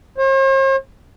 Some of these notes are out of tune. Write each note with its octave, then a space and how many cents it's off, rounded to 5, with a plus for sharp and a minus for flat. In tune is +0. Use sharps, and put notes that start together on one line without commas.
C5 +45